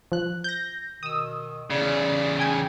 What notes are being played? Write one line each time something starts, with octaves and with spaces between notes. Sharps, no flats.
F3 F#6
G6 A#6
B2 D#3 D#6 E6
E2 C#3 G#4 D5
G5 G#5 G#6